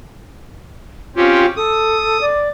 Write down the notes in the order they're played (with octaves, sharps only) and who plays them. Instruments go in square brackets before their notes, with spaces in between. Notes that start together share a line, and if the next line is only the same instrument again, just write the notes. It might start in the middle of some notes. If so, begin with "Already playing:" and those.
[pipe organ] C4 C#4 G4 [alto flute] F4
[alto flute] A4 [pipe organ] D#6
[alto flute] D5